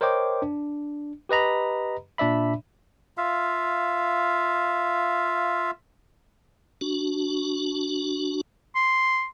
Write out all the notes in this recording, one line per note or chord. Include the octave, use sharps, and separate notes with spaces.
A#4 C5 C#5 D#5 G5 D6
D4
G4 B4 D#5 A#5 B5
A#2 D4 D5 E5 B5
F4 E5 F5
D4 F#4
C6